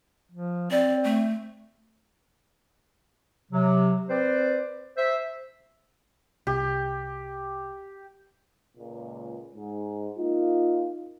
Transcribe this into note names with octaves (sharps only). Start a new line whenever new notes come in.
F3
C4 D5
A3
C3 F#3
C4 B4 C5 D5
C5 E5
C2 G4
C#2 A#2
G#2
A#3 D#4 F4